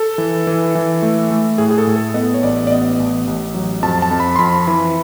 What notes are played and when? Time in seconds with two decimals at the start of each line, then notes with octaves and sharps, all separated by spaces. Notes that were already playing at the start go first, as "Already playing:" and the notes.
Already playing: A4
0.18 E3
0.47 E3
0.75 E3
1.02 A3
1.31 A3
1.58 A2 G#4
1.71 G#4
1.78 A4
1.87 A2
1.96 A4
2.14 B3 D#5
2.34 C#5
2.43 A1 D5
2.67 D5
2.70 B3 D#5
3.00 A1
3.27 A1
3.54 F#3
3.82 F2 A5
4.02 A5
4.11 F2
4.20 B5
4.36 C6
4.39 F2 B5
4.67 E3